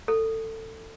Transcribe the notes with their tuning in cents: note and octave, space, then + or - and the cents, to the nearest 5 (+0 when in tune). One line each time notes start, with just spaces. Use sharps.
A4 +20